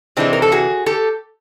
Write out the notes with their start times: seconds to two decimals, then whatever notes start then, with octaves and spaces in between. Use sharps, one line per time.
0.17 C3 E3 G#3 C4 D4
0.33 A#4
0.42 A4
0.52 F#4 G#4
0.86 G4 A4